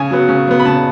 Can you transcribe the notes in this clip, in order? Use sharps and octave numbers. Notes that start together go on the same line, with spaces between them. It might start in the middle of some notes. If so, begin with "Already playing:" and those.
Already playing: C#3 G#5
F#3 B3
C#3
F#3 B3
B5
C#3 A5